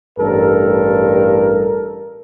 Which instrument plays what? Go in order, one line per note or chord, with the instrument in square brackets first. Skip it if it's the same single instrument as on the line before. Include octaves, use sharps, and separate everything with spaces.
[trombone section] A1 G2 A4 A#4